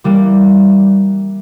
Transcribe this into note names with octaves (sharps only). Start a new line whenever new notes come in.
E3 G3 A#3